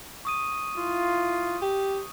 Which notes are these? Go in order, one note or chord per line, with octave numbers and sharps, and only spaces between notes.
C#6 D#6 D#7
E4 F4
G4